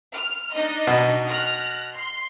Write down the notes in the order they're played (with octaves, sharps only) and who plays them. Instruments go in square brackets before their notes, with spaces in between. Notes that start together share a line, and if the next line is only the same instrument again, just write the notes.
[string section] F6
D4 D#4 D#5
[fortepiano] B2
[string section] F6 F#6 A#6
C6